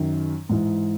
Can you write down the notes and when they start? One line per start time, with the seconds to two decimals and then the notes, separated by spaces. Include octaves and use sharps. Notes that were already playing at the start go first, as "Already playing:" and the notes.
Already playing: F#2 D#3
0.49 G#2 E3